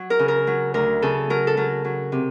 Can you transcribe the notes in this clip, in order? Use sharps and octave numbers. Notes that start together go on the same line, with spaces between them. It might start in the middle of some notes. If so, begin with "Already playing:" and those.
Already playing: F#3
A#4
C#3
A#4
F#3
D2 A#4
C#3 A4
F#3 A#4
A4
F#3 A#4
F#3
C3